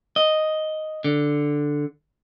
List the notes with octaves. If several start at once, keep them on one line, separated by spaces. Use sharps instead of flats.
D#5
D3